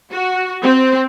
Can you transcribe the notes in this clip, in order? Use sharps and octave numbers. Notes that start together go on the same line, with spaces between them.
F#4
C4